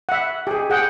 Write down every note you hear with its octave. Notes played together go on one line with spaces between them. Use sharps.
E5 F#5
G4 G#4
G#4 F#5 G5